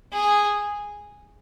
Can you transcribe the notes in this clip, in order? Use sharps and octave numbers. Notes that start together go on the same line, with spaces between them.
G#4